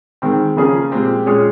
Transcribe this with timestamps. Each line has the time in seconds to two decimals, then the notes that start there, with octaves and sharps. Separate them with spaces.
0.22 D#3 G#3 C4
0.56 C#3 F3 A#3 C#4 G#4
0.91 A#2 G#3 C4 G4
1.26 A#2 G#3 C#4 G#4 C#5